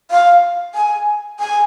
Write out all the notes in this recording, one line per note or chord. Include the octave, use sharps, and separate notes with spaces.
F5
G#5
G#5